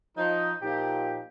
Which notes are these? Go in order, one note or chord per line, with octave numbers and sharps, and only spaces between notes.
F3 D#4
A#2 F3 D#4 G4